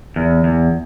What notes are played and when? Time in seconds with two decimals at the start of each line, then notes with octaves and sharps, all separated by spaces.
0.16 E2
0.44 E2